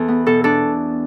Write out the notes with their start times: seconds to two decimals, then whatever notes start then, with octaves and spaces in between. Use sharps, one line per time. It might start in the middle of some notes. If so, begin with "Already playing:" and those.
Already playing: E2 A4
0.08 B3
0.27 B2 A4
0.44 D4 A4